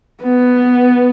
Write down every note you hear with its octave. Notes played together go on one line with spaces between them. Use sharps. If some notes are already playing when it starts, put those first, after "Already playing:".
B3